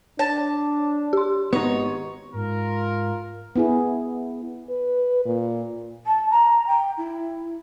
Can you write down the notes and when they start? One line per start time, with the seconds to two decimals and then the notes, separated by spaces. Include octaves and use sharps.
0.19 D4 C#5 A5
1.13 G4 C6
1.53 G#1 B3 D#4 C#5
2.33 G#2 F4 A#4
3.56 B3 E4 G#4
4.70 B4
5.25 A#2
6.06 A5
6.30 A#5
6.67 G5
6.97 E4